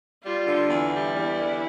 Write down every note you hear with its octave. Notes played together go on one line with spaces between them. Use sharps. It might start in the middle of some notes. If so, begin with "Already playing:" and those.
G3 F4
D3
E2
G3 E4
E2
D3